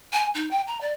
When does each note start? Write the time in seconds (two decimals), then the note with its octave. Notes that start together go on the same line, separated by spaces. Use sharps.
0.13 G#5
0.34 D#4
0.51 G5
0.67 A#5
0.81 D5